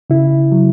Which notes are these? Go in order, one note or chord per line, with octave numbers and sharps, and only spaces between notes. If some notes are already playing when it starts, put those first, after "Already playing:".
C#3 E4
F#3